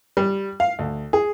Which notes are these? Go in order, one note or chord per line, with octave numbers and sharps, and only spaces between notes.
G3
F5
D2
G#4